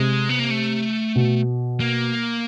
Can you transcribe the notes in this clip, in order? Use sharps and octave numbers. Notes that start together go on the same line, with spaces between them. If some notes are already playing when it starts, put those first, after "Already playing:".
Already playing: C3 G#3
B3
A#3
A3
B2
A#3